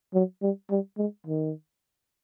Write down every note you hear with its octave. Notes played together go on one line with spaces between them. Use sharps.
F#3
G3
G3
G#3
D#3